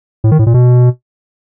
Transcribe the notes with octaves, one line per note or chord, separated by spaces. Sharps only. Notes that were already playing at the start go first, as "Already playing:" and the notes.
A2
D#3
A2
A#2
B2